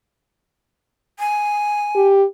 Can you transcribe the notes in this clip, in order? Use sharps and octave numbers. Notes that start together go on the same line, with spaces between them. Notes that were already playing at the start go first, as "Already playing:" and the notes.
G#5
G4